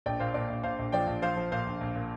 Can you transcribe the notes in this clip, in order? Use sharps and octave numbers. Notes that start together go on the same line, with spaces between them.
A#1 D5 G5
A#2 C5 F5
A#2 D5
A#1
A#1 C5 F5
A#1
F3 D5 G5
A#1
F3 C5 F5
F3
A#2 C5 F5
A#1
A#1
A#2